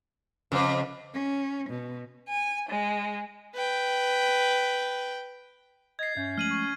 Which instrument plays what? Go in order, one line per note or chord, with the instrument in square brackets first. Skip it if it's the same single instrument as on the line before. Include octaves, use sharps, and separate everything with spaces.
[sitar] F2 [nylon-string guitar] C#3 C5
[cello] C#4
B2
[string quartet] G#5
G#3
[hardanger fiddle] B4 G5
[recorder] D#5 [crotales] G#6 A6 C7
[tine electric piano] G2 E5 G6 [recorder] C#4
[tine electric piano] F3 G#3 A3 [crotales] F6 D#7 F#7
[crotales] C#6